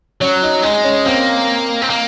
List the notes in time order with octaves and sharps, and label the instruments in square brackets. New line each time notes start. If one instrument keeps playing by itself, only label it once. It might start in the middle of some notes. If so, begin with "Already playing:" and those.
[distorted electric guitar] F#3 [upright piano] C#4
[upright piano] D#4
[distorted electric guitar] G#3 [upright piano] D#4
[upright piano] C#4
[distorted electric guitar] A#3 [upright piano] C4
[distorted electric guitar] C4
A#3